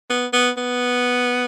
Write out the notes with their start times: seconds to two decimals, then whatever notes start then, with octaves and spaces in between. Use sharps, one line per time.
0.10 B3
0.33 B3
0.57 B3